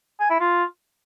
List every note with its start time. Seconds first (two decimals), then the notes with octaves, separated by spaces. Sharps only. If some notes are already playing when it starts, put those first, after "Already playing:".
0.20 G#5
0.30 E4
0.40 F4